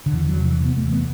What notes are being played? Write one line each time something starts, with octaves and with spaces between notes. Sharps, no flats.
D3
E2 E3
E3
F#3
C3
E3
C3
B3
A3
E2
B3